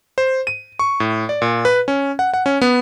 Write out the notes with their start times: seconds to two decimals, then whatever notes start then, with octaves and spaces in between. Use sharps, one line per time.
0.18 C5
0.47 D#7
0.79 C#6
1.00 A2
1.29 D5
1.42 A#2
1.65 B4
1.88 C#4
2.19 F#5
2.34 F#5
2.46 C#4
2.61 B3